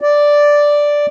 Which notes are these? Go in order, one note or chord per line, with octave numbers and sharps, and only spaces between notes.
D5